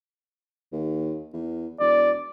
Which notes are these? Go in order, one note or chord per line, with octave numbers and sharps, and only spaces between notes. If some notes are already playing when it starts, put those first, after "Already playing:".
D#2
E2
E1 D5